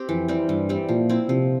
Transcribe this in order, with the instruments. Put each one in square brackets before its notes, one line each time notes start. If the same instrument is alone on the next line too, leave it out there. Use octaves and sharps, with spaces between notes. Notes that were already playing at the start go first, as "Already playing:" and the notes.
Already playing: [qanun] C4 G4
[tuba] F2 [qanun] E3
[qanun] G3 C4
[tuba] G2 [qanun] E3
[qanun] G3 C4
[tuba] A#2 [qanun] F3
[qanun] C4 E4
[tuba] C3 [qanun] F3